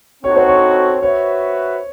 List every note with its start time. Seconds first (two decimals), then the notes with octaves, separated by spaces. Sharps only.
0.23 C4 D#4 F#4 A4 C#5
0.36 C5
0.48 C#5
1.02 F#4 B4 C#5 E5